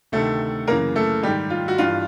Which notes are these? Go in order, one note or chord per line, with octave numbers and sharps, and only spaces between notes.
D2 C3 D#3 A3 A4
F#2 C#3 E3 A#3 A#4
A3 A4
G#2 D#3 G3 G4
F4
F#4
G2 E3 F4